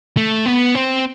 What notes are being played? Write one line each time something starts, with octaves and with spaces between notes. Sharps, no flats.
A3
B3
C4